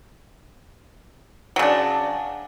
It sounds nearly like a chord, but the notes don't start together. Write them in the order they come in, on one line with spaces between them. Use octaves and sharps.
F#3 C#3 D4